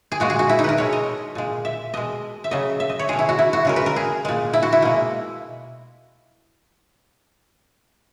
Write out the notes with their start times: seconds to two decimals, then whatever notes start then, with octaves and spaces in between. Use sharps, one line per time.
0.12 G#4
0.20 A#2 G#3 F#4
0.30 G#4
0.39 F#4
0.49 E4
0.59 D#4
0.64 A#4 B4
0.78 B2 G#3 C#5
0.93 D#5
1.35 A#2 G#3
1.65 E5
1.94 B2 G#3 D#5
2.44 E5
2.51 C#3 F#3 D#5
2.80 E5
2.90 D#5
2.99 C#5
3.09 B2 G#3 G#4
3.19 E4
3.29 F#4
3.39 E4
3.53 F#4
3.65 C#3 G#3 A#4
3.76 B4
3.86 A#4
3.96 G#4
4.25 A#2 G#3
4.53 E4
4.63 F#4
4.73 E4
4.82 B2 G#3 A#3